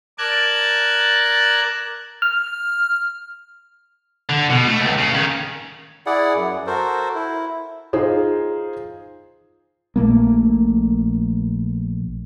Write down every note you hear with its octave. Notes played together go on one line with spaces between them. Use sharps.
A#4 D5 A5 F#6 G#6
F6
D3
B2
A3
C#2
C#3
D#3 C#4
E4 G#4 D5 F#5
F#2
F#4 A4 A#4 C5
E4
D#4 F4 G#4 C5
A#1 A#2 A3 A#3